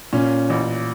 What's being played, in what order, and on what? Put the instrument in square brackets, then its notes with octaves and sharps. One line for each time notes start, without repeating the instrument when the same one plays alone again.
[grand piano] A#2 [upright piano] C#4
[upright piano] A1